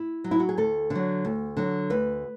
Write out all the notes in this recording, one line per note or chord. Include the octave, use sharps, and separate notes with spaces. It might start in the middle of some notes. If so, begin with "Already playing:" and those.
Already playing: E4
F#3
E4
F#4
G#4
D2 A4
D3
F#3
D2
D3 F#3
D2 B4